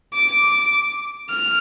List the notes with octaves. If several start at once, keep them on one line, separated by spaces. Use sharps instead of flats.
D6
F6